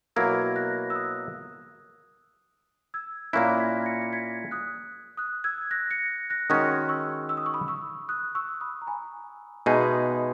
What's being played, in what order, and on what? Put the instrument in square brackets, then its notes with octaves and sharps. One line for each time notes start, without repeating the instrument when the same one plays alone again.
[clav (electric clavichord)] B2 F#3 A#3 E4 A#4 [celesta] E6 G#6
[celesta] F#6 A#6
E6
D#6 F#6
E6 G#6
[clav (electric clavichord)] A#2 A#3 C#4 E4 [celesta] F#6 A#6
[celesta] G#6 B6
A#6 C#7
C#7
G#6 B6
D#6 F#6
D#6 F#6
E6 G#6
F#6 A#6
A#6 C#7
F#6 A#6
[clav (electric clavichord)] D#3 G#3 C#4 F#4 C#5 [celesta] D#6 F#6
[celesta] C#6 E6
E6
D#6
C#6
B5 D#6
C#6 E6
D#6 F#6
C#6 E6
B5 D#6
A#5
G#5 B5
[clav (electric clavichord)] B2 G#3 D#4 G#4 B4 [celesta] E5 G#5